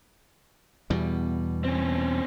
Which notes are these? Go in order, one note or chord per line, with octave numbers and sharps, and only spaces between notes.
E2 B2 G3
C4 C#4